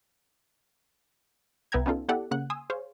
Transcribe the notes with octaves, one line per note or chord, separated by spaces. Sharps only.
C2 B3 E5 G5 A#5 G#6
B3 C#4 D#4 F4 A4
B3 E4 G4 A4 D5 F#5
C#3 A#3 F#5 F#6
G#5 C6 D#6 E6
G#4 C5 C#5 F5